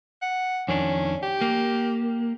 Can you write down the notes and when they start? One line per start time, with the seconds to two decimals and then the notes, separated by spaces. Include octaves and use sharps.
0.22 F#5
0.68 F2 D#3 C#4 D4
1.23 G4
1.41 A#3